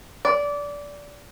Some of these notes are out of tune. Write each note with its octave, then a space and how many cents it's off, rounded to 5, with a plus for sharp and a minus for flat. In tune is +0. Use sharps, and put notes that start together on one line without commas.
D5 -20